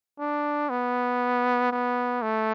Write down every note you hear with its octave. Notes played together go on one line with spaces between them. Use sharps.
D4
B3
B3
A3